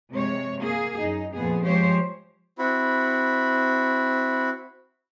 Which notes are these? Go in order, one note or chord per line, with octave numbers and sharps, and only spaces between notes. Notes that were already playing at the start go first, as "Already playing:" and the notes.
C3 G#3 C#5
A#3 G#4
F#2 D#4
F2 A#2 B3 G#4
F3 G#3 G4 C5 C#5
C4 E4 F#4 B5